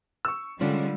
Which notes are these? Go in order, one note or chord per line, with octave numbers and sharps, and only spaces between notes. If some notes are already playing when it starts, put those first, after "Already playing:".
C#6 E6
D3 G3 G#3 C#4 D4 F4